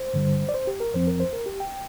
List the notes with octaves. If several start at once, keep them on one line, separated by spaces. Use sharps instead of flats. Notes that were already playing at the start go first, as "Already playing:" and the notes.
Already playing: C5
G2 D3 G3
D5
C5
G4
A#4
F2 F3 C4 C5
A#4
C5
A#4
G4
G5